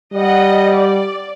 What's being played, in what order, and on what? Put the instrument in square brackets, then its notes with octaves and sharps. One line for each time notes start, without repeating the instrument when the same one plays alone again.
[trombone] G3 [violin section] D#5 F#5
[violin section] D5